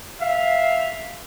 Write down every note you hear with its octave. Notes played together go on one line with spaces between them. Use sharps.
E5 F5